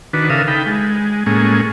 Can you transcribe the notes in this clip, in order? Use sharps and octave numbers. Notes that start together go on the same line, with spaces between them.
D#3 D4 F#4 B4
C#3 A4 A#4 E5 F5 D#6
D#4 A4 G5 B5
G#3
A2 G#3 A#3 C#4 G#4